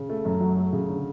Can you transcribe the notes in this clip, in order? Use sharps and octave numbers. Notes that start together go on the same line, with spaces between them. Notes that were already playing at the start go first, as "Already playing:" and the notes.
Already playing: C#3
A3
F#2
F#3
A3
C#3
D3